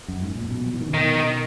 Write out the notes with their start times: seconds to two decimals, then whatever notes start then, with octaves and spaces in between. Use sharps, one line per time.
0.08 F#2
0.22 G#2
0.35 A#2
0.50 B2
0.66 F#3
0.73 E3
0.80 D#3
0.88 C#3
0.94 B2 D#3